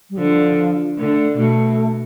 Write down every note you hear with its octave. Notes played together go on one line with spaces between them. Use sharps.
G3
D3 F3
D3 A3
B2 A3